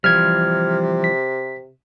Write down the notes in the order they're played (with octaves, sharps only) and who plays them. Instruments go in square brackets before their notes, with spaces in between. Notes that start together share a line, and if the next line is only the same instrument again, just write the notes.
[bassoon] C3 [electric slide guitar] E3 F3 G3 [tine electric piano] F6 G#6
[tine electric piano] B6